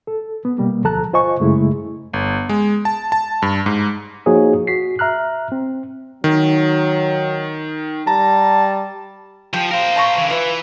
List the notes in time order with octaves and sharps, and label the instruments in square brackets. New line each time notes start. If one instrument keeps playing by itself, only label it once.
[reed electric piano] A4
B3
B2 G3 A#3
D2 F3 A4 A5 A#5 F#6
F4 C5 D#5 G#5 C#6
F#2 C#3 G#3 A3 E4 G#4
[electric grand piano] G1
G#3
A5
A5
G2
G#2
[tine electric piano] F3 A#3 D#4 F#4 G#4 C#5
F#4 B6 C7
E5 A#5 F6 F#6
C4
[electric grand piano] D#3 [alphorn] F#3
[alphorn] G3 [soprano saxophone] A5 [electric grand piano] A#5
[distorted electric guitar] F3 [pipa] G4 G5
[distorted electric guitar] A#4 C5 [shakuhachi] F5
[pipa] A5 A#5 C#6
[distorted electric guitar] D3 E3
[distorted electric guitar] E3 [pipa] F4 E5 [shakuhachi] B4